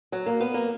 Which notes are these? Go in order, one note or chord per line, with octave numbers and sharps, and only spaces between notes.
F#3
A#3
B3
A#3